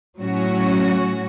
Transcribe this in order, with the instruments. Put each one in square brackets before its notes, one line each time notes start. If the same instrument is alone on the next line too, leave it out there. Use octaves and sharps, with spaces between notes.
[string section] A2 F#3 C#4 F#4